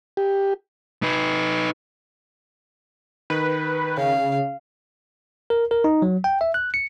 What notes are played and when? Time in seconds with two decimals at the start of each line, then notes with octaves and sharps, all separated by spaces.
0.17 G4
1.03 D#4 B4
3.30 D#3 B4
3.97 C#3 F5
5.50 A#4
5.71 A#4
5.84 D#4
6.02 F#3
6.24 G5
6.41 E5
6.54 F#6
6.74 C#7